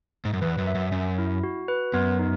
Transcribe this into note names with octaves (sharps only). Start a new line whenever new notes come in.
G#2
F#2
E2 B4
F#2
E5
F#2
F#2 C#4
E4
F#4
B4
F#2 B3
D#4